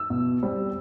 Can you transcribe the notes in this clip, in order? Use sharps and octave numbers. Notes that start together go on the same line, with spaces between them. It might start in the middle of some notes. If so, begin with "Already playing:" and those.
Already playing: E6
B2
G3 C4